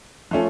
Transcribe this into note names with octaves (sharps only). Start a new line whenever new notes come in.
F3 A3 C#4